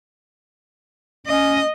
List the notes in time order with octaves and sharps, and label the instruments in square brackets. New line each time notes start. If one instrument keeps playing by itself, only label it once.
[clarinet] C#4 [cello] D#5